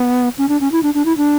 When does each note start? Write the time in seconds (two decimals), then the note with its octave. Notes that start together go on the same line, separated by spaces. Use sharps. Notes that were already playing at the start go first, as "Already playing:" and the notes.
Already playing: B3
0.38 C#4
0.49 D4
0.61 C#4
0.72 E4
0.83 D4
0.94 D4
1.05 E4
1.17 D4